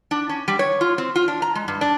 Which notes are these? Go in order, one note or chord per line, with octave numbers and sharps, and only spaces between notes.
D4
C#4
G3
C#5
F4
C4
F4
D4
A#5
G#3
G2
D4